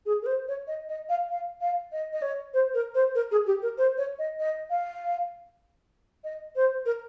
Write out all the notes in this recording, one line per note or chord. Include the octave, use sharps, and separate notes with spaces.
G#4
A#4
C5
C#5
D#5
D#5
F5
F5
F5
D#5
D#5
C#5
C5
A#4
C5
A#4
G#4
G4
A#4
C5
C#5
D#5
D#5
F5
D#5
C5
A#4